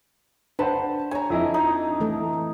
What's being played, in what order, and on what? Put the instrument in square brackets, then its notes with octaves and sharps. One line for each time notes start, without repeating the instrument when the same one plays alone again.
[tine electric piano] D4 [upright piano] B4 C5 F#5 [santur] A5
[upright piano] C#5 [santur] G#5 A#5
[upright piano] F2 E4 D#5
[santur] D#4
[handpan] E3 A3 A4